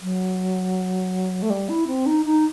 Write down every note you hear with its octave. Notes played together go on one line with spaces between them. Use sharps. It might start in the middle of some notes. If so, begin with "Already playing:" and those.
F#3
A3
G3
E4
C4
D#4
D#4